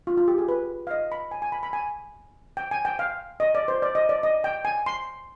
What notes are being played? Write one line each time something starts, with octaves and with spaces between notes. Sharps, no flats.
F4
F4
G4
G#4
B4
F5
D#5
B5
G#5
G#5
B5
B5
G#5
G5
G#5
G5
F5
D#5
D5
C5
D5
D#5
D5
D#5
G5
G#5
C6